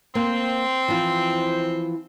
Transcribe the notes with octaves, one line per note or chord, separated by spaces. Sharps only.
A#3 C4
E3 F3 F4